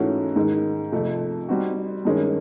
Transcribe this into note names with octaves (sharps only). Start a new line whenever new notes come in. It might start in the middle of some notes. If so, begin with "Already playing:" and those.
Already playing: G#2 E3 A3 C#4 F#4
G#2 D#3 G#3
F2 C3 F3 A3
G3 C4 D#4 F#4
G2 D#3 G#3 C#4